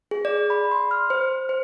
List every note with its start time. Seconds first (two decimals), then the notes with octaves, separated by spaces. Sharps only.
0.11 G#4
0.25 D5
0.50 B5
0.71 C6
0.91 F6
1.10 C5
1.49 C5